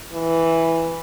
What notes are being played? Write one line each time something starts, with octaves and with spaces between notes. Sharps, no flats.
E3